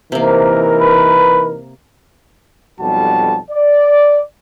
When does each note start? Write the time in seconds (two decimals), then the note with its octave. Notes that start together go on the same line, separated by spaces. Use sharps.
0.12 C3 E3 A#3 D#4 A#4
0.81 B4
2.80 B1 F2 G3 F#4 A5
3.51 D5